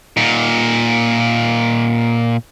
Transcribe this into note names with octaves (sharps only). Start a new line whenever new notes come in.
A#2 D#4